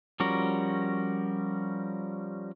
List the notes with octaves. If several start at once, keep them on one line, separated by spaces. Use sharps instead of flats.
F3 G3 C#4 F#4 A#4